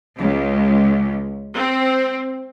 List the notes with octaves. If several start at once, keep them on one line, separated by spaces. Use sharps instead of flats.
C#2
C4